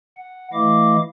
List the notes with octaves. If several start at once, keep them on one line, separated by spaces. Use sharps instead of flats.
F#5
E3 A3 E4 D#5 F5 D6